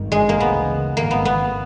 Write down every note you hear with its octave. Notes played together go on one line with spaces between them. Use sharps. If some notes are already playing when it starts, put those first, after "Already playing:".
Already playing: G#1 G2 D#3
G#3
A#3
D2 C#3 E3 B3
G#1 G2 D#3 A#3
B3
B3